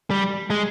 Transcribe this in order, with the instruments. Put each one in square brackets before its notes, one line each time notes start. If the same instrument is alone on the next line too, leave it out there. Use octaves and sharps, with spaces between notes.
[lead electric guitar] G3
G#3